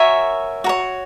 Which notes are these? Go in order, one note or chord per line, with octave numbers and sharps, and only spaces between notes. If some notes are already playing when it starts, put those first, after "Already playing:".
Already playing: F#4 A#4 C#5 E5 G#5
F#4 A#4 C#5